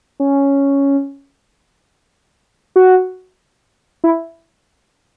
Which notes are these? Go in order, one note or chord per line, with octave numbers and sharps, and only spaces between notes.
C#4
F#4
E4